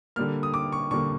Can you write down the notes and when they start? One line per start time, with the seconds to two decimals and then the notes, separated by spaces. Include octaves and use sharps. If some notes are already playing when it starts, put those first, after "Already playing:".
0.16 D3 G3 A#3 F6
0.43 D#6
0.54 D6
0.72 C#6
0.91 D3 G3 A#3 C#6